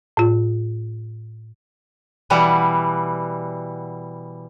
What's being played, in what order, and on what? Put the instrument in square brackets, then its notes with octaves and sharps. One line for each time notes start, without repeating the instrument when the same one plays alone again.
[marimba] A2 F4
[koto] B2 E3 G3 F#5